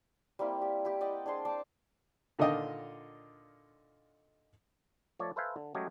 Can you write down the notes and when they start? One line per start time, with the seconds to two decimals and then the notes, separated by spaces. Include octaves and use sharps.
0.39 G3 A#3 C4 E4
0.62 G4
0.85 E4 G4
1.01 D5 D#5 F#5 G5
1.26 D4 G#4 C5 C6
1.45 D5 G5 A5 D6
2.39 A#2 D3 D#3 F4 D#5 G5
5.20 F3 A3 C#5 D5
5.36 A4 B4 C5 E5 F5 G#5
5.56 D3
5.75 F#3 G#3 A3 C#4 G4 G#4